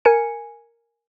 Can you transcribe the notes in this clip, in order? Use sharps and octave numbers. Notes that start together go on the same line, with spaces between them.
A#4 G#5 C#7